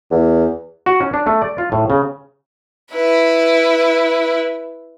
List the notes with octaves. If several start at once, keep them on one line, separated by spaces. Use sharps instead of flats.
E2
F#4
C#4
D4
A3
D5
F4
A2
C#3
E4 B4